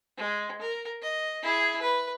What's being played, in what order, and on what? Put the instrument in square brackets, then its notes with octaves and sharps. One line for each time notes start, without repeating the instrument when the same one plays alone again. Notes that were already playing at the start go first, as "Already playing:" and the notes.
[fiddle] G#3
A#4
D#5
E4 G#4
B4